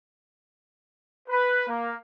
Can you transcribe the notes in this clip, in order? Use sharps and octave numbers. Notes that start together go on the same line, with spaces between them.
B4
A#3